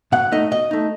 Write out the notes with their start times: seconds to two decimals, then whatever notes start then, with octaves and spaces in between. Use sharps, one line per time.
0.12 B2 F#5
0.32 A3 D#4 D#5
0.51 B2 D#5
0.71 A3 D#4